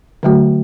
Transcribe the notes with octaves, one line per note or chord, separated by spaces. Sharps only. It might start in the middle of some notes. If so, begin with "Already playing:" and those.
D3 F#3 A3 F#4